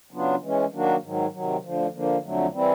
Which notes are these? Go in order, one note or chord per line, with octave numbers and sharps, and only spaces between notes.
C#3 F#3 B3 D4 F4
E3 G#3 C#4
D#3 F#3 A#3 D4 F#4
G#2 D#3 F#3
C3 D#3 F#3
D2 D3 F3
D3 F3 A#3
F2 D3 F#3 A3
E3 G3 C4 E4